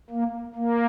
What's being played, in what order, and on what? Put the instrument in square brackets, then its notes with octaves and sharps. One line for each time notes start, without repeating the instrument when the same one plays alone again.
[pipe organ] A#3
A#3